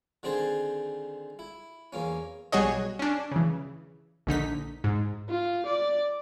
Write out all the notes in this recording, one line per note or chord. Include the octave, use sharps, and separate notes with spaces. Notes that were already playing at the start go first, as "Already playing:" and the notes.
D3 D#3 C4 G#4 C5 A5
E4
E2 A#3 C#4
B1 G3 F#4 G#4 C#5 D#5
C#4 D4
C#3 E3
A#1 D3 D#4 B6
G#2
F4
D5